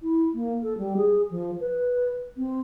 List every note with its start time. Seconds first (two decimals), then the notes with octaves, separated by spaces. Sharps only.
0.02 E4
0.34 A#3
0.63 A4
0.78 G3
0.97 G#4
1.31 F3
1.60 B4
2.37 C4